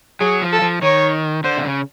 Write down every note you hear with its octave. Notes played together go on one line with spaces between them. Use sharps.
F#3 G#4
F3
A4
F3
D#3 C#5
D3 C5
C3
C#3